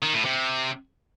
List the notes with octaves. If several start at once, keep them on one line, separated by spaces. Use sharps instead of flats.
D#3
A2
C3